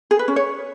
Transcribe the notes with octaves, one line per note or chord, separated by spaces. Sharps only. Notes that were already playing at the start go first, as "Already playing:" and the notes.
G#4
B4
C#4
C#5